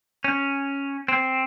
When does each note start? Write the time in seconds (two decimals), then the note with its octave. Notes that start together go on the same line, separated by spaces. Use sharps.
0.24 C#4
1.08 C4